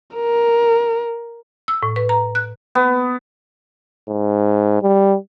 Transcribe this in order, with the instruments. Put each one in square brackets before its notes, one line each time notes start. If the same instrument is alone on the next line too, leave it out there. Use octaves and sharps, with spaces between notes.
[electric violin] A#4
[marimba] E6
A2
B4
A#5
F#6
[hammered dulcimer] B3
[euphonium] G#2
G3